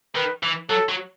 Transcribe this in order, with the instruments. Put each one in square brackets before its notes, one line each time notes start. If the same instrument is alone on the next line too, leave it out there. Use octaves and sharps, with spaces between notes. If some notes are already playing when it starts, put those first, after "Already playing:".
[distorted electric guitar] D#3 [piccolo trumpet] B4
[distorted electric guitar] E3
[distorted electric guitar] F#3 [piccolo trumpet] A4
[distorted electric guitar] F#3